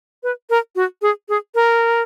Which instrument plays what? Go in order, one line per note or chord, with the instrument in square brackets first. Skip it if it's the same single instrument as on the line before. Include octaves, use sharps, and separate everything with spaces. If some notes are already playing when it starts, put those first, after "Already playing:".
[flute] B4
A#4
F#4
G#4
G#4
A#4